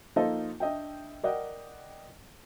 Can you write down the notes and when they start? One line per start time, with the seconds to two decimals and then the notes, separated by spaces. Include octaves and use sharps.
0.16 F3 A#3 D#4 A4 C5 D#5
0.60 D4 D#5 E5 G5
1.23 A#4 D5 D#5 F#5 G5